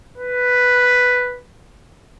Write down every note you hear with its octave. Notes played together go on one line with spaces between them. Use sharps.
B4